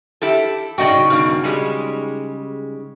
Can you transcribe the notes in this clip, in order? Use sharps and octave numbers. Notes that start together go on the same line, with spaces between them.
E4 G4 A4
C#3 D#4 F#4 D5 D#5 G5
G2 B2 D#3
G3 G#3